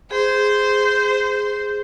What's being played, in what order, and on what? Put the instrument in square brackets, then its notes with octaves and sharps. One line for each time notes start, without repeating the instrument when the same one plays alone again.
[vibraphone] G#4 [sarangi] C5